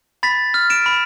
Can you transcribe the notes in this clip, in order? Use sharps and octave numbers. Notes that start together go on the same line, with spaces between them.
B5 A6 B6
F6
D7 E7
B5